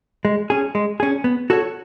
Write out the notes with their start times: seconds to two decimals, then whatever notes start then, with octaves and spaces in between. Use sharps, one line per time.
0.25 G#3
0.50 C#4 G#4
0.75 G#3
1.00 C#4 G#4
1.24 B3
1.50 F#4 A4 C#5